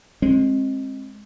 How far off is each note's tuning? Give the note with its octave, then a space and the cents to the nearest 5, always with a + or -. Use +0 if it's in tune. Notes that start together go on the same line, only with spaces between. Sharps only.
G#3 +0 C4 +30